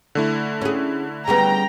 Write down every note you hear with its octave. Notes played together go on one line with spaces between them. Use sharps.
D3 A3 E4
C#4 G#4
C#3 G3 B3 G5 A#5